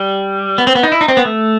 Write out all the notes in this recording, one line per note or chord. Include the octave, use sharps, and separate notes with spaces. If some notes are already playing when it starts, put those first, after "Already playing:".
Already playing: G3
B3
C4
B3
D#4
E4
D#4
C4
B3
A3